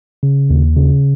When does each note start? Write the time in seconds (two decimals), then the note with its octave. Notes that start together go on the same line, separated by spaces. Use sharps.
0.23 C#3
0.50 D#2
0.77 C#3